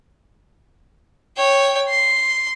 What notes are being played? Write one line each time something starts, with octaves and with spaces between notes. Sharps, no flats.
C#5 G5
C6